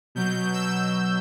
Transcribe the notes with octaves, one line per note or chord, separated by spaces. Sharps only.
B2 F#3 G6
E6